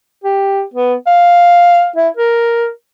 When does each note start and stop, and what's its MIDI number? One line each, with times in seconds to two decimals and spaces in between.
0.24 0.62 67
0.74 0.94 59
1.07 1.88 77
1.96 2.09 64
2.17 2.68 70